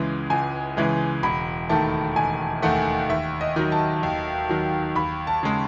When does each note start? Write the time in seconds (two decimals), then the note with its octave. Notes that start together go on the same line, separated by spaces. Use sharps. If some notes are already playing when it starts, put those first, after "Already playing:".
Already playing: C#2 C#3 E3 G#3
0.30 C#2 G#5
0.77 C#3 E3 G#3
1.23 E1 B5
1.69 D#2 D#3 A3 A5
2.16 E1 G#5
2.62 D#2 D#3 A3 F#5
3.10 D#2 E5
3.41 D#5
3.56 D#3 F#3
3.72 A5
4.03 D#2
4.49 D#3 F#3
4.95 D#2 B5
5.27 A5
5.43 C#3 G#3